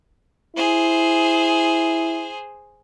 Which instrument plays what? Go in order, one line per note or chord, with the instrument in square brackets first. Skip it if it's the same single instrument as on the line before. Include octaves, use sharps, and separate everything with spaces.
[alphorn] E4 [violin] G#4 C5